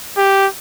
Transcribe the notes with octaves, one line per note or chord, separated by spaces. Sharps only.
G4